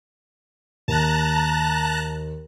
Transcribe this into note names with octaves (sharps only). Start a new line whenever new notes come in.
D#2 A5 A#5 F#6